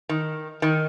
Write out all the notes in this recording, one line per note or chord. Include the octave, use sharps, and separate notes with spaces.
D#3
D#3